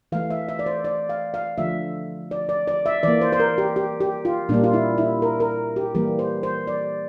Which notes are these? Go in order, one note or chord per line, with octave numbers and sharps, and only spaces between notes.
E3 A3 F5
E5
E5
D5
C5
D5
F5
F5
D3 F3 A3 E5
D5
D5
D5
E5
E3 A#3 D5
C5
C5
A#4
G4
G4
G4
F4
A#2 G3 A#3 D4
F4
E4
E4
A#4
A#4
G4
E3 G3 A#3 A#4
C5
C5
D5